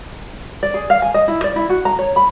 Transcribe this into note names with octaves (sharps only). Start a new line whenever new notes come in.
D5
G#4
F5
G#5
D#5
E4
D5
E4
F#4
A#5
C#5
B5